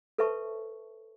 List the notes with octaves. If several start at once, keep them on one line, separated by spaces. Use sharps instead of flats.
A4 B4 C5 E5 A5 C#6